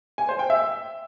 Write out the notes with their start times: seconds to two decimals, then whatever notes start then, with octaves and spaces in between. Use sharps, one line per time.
0.18 G#5
0.29 C5
0.39 G5
0.50 E5